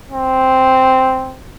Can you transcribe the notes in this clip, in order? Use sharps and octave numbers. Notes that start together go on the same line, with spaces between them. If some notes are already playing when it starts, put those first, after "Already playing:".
C4